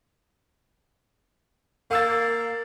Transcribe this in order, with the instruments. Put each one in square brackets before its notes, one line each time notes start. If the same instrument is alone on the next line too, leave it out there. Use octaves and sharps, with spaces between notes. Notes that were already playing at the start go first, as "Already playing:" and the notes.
[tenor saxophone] A#3 [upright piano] F5 E6 A6